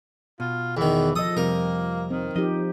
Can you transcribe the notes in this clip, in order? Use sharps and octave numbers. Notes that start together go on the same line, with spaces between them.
B2 F4
E2 D#3 E3
F3 A4 D#5 D#6
F2 C3 G3 A#3 A#4
D#3 C4
F3 D#4 G4 D#5